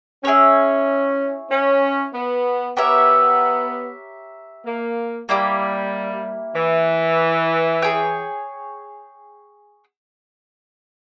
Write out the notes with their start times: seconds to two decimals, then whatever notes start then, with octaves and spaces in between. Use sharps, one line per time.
0.24 C#4 E4 G#4 C#5
1.51 C#4
2.14 B3
2.77 B3 G4 A#4 C#5 E5
4.66 A#3
5.29 G3 A#3 E4 G4
6.56 E3
7.82 G#4 C#5 G5